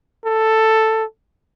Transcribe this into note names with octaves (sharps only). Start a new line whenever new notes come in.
A4